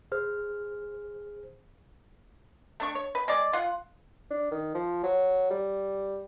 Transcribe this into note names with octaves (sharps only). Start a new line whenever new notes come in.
G#4 C5 F6
A3 D4 C#6
C#5
B4
G#3 D5
F4 F#5
D4
D#3
F3
F#3
G3